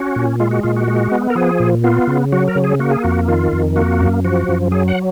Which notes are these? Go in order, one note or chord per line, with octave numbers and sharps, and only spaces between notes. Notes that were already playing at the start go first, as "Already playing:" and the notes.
Already playing: C#4 F#4
A#2
G#3 F4
F#4
A#2 F4
F#4
G#3
B3
A#4
F3 G#4
A#2
B3 F4
C#3
F#3 F#4
A#4
C#3
G#4
A#3 F#4
G#4
F2 F#4
D#3 F4
F2
A#3 F#4
F#2
F3 F#4
F#2
F#3 G#4
F#5